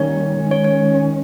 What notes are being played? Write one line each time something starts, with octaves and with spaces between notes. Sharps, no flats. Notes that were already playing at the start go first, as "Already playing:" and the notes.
Already playing: D#3 G3 A#3 C#4 C#5
D#3 G#3 C#4
C#5
C#5